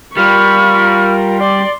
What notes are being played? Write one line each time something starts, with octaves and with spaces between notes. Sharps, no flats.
G3 F4 A#4 B5 C#6 F6
D5 C6